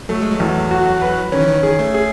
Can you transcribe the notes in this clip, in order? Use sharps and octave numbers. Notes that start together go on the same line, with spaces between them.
F#3 A3
G#3
F#3
E2
F#4
B4
D#3 C#4
E3
D#3
D#3 G#4
A3
G#4